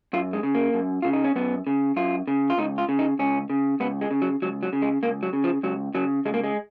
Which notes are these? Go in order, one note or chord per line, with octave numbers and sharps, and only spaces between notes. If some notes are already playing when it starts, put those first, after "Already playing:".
F#2 F4
G#3
C#3
A#3
F#2
C#3 F4
D#4
C#4
F#2 B3
C#3
F#2 F4
C#3
F4
C#2 D#4
F4
C#3
D#4
C#2 C#4
C#3
C#2 B3
G#3
C#3
F#3
C#2 F#3
F#3
C#3
G#3
C#2 A#3
F#3
C#3
F3
C#2 F#3
C#3 F#3
C#2 G#3
A#3
G#3